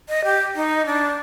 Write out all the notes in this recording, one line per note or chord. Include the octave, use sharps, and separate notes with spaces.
D#5
G4
D#4
D4